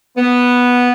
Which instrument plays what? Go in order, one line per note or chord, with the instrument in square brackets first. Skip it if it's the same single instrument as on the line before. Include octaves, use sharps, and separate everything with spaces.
[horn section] B3